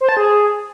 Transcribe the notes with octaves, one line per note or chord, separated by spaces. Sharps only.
C5
A5
G#4